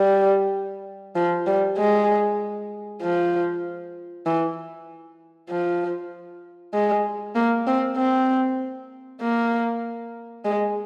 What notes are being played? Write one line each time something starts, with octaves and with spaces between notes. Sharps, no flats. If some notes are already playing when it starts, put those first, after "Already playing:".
Already playing: G3
F3
G3
G#3
F3
E3
F3
G#3
A#3
C4
C4
A#3
G#3